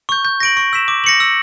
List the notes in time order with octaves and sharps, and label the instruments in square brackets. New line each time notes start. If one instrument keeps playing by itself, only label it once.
[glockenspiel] C#6 G6
G6
A#6 D7 F#7
C#6
E6 B6 E7
D6
A#6 C#7 F#7
E6